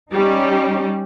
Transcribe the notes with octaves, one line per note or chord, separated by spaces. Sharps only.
G3 C#4 D#4 G4